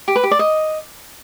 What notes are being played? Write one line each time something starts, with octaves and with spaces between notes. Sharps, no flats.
G4
B4
G4
D5
D#5